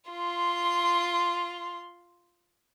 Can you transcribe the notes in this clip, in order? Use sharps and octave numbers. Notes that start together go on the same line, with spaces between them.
F4 C6